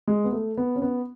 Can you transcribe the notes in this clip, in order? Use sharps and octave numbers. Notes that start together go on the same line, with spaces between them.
G#3
B3
A3
B3
C#4
B3